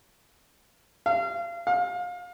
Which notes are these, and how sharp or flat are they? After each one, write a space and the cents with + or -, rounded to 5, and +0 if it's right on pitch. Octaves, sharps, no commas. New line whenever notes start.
F5 -30
F5 +30